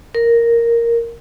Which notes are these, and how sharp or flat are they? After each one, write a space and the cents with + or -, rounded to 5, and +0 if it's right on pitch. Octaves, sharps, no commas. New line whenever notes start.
A#4 +0